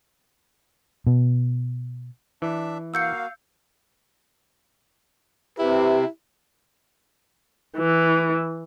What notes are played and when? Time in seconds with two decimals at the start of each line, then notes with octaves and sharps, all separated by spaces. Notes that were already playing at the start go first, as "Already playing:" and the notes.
1.07 B2
2.42 E3 D4 E5
2.94 A#3 F#4 F5 E6 G6 C#7
5.59 C3 E4 G4 B4
7.78 E3